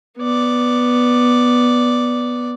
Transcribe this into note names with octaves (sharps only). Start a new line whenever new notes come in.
B3 D5